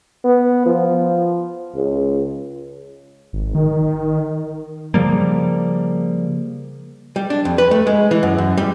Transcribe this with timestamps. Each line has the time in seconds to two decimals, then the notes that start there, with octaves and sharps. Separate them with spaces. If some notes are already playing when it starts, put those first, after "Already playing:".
0.25 B3
0.66 F3
1.75 C#2
3.33 G#1
3.55 D#3
4.94 C#3 F3 G3 A#3
7.16 G3
7.30 D4
7.45 F2
7.58 B4
7.71 A3
7.87 G#3
8.11 E3
8.23 F#2
8.38 F#2
8.57 G3